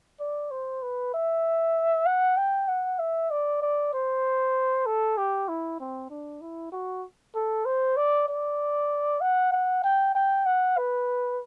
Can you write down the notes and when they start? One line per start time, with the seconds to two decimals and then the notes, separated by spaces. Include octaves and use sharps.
0.20 D5
0.51 C5
0.82 B4
1.14 E5
2.06 F#5
2.37 G5
2.68 F#5
2.99 E5
3.31 D5
3.62 D5
3.93 C5
4.86 A4
5.18 G4
5.48 E4
5.80 C4
6.10 D4
6.41 E4
6.72 F#4
7.35 A4
7.65 C5
7.97 D5
8.28 D5
9.21 F#5
9.52 F#5
9.83 G5
10.15 G5
10.46 F#5
10.77 B4